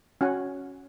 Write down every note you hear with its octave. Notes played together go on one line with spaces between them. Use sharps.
C#4 F#4 F#5 G#5